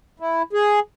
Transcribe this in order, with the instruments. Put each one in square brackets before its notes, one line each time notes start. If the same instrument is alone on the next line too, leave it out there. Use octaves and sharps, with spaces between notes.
[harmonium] E4
G#4